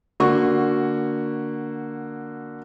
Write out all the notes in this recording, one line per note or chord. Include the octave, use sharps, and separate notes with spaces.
D3 A#3 F#4 C#6